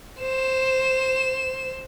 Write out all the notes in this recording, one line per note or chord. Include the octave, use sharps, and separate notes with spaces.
C5 E7